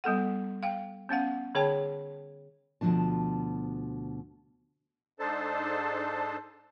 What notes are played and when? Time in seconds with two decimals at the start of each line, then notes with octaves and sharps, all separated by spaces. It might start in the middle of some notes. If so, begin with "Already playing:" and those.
0.04 G3 B3 A4 F#5
0.63 F5 G5
1.09 B3 C#4 F5 F#5
1.55 D3 G#4 C#5 G5 A5
2.81 D2 B2 E3 F3 D4 A5
5.19 G#2 D4 D#4 A4 C5 A5